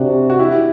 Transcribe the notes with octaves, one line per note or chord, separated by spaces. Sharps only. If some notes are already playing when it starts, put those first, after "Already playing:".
Already playing: C3 D4 F#4
F#4
E4 G4